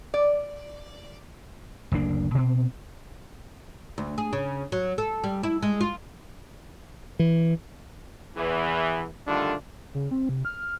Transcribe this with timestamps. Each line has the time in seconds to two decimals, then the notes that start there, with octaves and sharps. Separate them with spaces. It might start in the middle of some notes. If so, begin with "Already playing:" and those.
0.14 D5
1.92 F#1 D2 A#3 D4
2.35 B2 C4
3.98 D2
4.18 G#4
4.33 C#3
4.72 F#3
4.98 A4
5.24 G3
5.43 E4
5.63 G#3
5.81 F4
7.19 E3
8.36 E2 E3
9.27 D3 D#3 G3 A3 D4 F4
9.94 C#3
10.11 C4
10.29 C3
10.45 F6